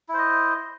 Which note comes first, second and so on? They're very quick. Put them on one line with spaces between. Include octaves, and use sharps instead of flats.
E4 C5 D#5